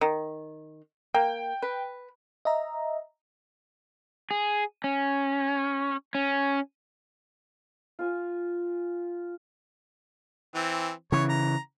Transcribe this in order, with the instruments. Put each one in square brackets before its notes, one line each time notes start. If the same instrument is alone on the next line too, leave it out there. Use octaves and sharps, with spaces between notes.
[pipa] D#3
[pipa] A#3 [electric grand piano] G5
[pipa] B4
[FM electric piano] D#5 E5 A#5
[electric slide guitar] G#4
C#4
C#4
[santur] F4 G#5
[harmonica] E3 C4
[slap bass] C#3 E3 [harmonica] C#5
[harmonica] A#5